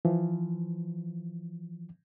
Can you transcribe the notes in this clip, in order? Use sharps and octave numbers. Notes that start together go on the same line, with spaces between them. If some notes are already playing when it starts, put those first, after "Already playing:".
E3 F3